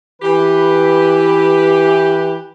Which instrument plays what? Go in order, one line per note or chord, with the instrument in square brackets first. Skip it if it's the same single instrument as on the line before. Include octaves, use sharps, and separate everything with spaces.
[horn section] E3 G4 B4